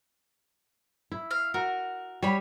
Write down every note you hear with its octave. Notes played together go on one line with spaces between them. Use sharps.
E4
F5
F#4 A#4
G3 C#5 B5